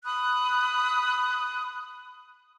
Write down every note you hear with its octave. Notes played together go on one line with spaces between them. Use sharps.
B5 D#6 F#6